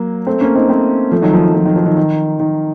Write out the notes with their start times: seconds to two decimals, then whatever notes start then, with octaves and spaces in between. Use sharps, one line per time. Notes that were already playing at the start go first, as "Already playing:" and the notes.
Already playing: F#3 A#3
0.27 A3 C4
0.41 A#3 C#4
0.55 C4 D#4
0.69 A3 C4
1.12 F3 A3
1.22 D#3 F#3
1.33 F3
1.44 D#3
1.55 F3
1.66 D#3
1.76 F3
1.86 D#3
1.97 D#3
2.40 D#3